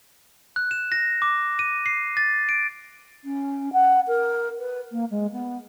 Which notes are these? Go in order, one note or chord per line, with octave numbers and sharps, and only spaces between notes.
F#6
E7
A#6
D6
D#7
C7
A6
D7
C#4
F#5
A#4
B4
A#3
G#3
B3